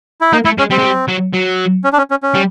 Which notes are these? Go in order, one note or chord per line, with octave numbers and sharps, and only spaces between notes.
E4
A#3 D#4
A3 E4
G#3 C#4
G3 C4
G#3
G3
F#3
F#3
C#4
D4
C#4
C#4
C#4
G3